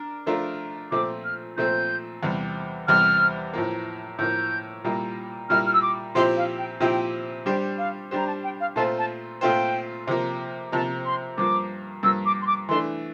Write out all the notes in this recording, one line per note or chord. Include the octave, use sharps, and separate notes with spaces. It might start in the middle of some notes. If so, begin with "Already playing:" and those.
Already playing: D4 A#4
F3 A3 D4 F4 A#4
A#2 F3 A3 C4 D6
F6
A#2 F3 A3 C4 G6
E2 C3 G3
E2 C3 G3 F6
A2 F3 A#3
A2 F3 A#3 G6
A#2 G3 A#3 E4
A#2 G3 A#3 E4 F6
F6
E6
D6
A#2 F3 C4 E4 G4 C6
F5
G5
A#2 F3 C4 E4 G4 G5
G3 D4 G4 C5 G5
F5
G3 D4 G4 C5 A#5
A5
G5
F5
A#2 A3 C4 F4 C5 A5
A5
A#2 A3 C4 F4 C5 G5
C3 F3 A#3
C3 F3 A#3 A5
C6
G2 F3 A#3 D6
G2 F3 A#3 E6
D6
C6
D6
E3 A3 D4 C6